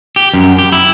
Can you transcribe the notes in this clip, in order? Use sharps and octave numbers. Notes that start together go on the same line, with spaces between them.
G4
F#2
G4
E4